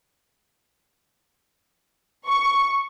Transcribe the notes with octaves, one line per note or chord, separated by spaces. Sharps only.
C#6